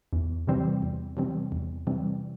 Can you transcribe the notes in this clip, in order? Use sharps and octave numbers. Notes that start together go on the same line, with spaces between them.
E2
C3 E3 G3 C4
E2
C3 E3 G3 C4
E2
C3 E3 G3 C4